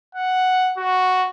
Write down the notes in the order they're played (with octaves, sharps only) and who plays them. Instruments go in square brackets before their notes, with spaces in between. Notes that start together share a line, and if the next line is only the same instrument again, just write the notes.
[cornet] F#5
F#4